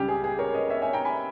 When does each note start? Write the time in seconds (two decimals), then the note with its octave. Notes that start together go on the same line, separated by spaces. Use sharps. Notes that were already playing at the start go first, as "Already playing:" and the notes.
Already playing: C#2 C#3 G3 G4
0.08 G#4
0.24 G#4
0.39 A#4 C#5
0.54 B4 D#5
0.70 C#5 E5
0.82 E5 G#5
0.93 G5 A#5
1.05 G#5 B5